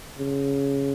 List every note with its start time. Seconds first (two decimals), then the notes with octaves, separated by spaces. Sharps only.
0.19 C#3